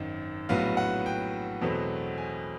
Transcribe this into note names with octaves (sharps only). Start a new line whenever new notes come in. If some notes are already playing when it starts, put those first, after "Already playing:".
Already playing: G#1 F#2 D#3
A#1 A2 F#3 B3 F5
F#5
G5
E2 B2 F#3 A3 C4
G#5